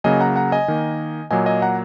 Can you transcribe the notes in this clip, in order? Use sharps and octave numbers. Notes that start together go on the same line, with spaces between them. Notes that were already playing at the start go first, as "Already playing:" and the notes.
C#3 F#3 A#3 D#5 G#5
F#5 A#5
F#5 A#5
D#5 G#5
D#3 A#3
A#2 F#3 A#3 D#5 G#5
D#5 G#5
F#5 A#5